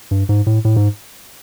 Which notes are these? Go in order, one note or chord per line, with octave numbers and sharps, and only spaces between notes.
G2
G#2
A2
A2
G#2